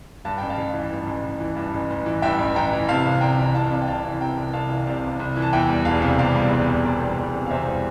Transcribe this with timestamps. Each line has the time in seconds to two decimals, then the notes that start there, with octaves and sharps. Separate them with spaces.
0.25 G2 A5
0.38 A1 G5
0.49 F5 A5
0.58 A1
0.74 E3
0.91 G2
1.07 A1
1.24 A1
1.40 E3
1.56 G2
1.74 A1
1.90 A1
2.06 E3
2.22 G2 E5 G5
2.39 A1
2.56 A1 G5 A#5
2.73 E3
2.88 C3 F5 A5
3.05 C2
3.21 C2 G5 A#5
3.38 E3
3.46 A#5
3.54 C3 F5 A5
3.71 C2
3.82 G5
3.87 C2 F5 A5
4.04 E3
4.20 C3 G5 A#5
4.37 C2
4.53 C2 F5 A5
4.70 E3
4.87 C3 D5 F5
5.04 C2
5.20 C2
5.37 E3
5.42 A5
5.53 E2 E5 G5
5.70 G3
5.85 E1 F5 A5
6.02 C3
6.19 E2 D5 F5
6.36 G3
6.51 E1
6.69 C3
6.84 E2 A#4 D5
7.01 G3
7.18 E1
7.34 C3
7.46 F5
7.50 E2 C5 E5
7.68 G3